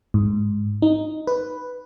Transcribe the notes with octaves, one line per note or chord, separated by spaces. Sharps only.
G#2
D#4
B4